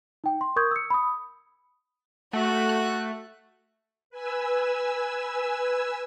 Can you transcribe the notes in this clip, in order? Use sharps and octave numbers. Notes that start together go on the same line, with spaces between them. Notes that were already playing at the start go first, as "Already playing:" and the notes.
D#4 G5
C6
A#4 C#6 D#6 G6 G#6
E6 C#7
B5 D#6
A3 F#4 F#6
B4 G#5 E6